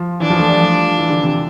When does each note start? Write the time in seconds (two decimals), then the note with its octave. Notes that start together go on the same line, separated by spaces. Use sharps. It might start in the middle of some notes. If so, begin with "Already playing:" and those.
Already playing: F3
0.20 E3 D4
0.30 F3
0.39 A3
0.49 G3
0.59 F3
0.98 E3
1.10 D3
1.23 C3